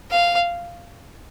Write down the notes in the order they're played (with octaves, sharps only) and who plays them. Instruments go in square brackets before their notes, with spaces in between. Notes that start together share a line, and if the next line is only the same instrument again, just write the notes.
[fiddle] F5